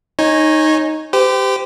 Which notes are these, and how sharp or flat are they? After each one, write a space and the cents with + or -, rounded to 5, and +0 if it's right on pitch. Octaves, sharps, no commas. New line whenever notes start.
D#4 +0 C#5 -20 G#5 +0
G4 +0 C5 -40